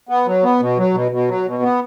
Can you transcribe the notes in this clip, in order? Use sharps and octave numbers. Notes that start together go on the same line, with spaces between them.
B3
F#3
B3
B2
F#3
B2
B2
F#3
B2
B3